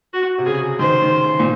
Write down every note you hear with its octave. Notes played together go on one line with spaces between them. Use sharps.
F#4
C3
C#3 G#4
D#3 C5
D#3
C#3
A#2